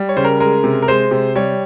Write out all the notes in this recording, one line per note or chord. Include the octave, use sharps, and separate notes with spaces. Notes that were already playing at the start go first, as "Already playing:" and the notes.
Already playing: G3
C#5
C#3 C5
A#4
G#3 A#4
C3
A#4
G#3 C5
C3
G3 C#5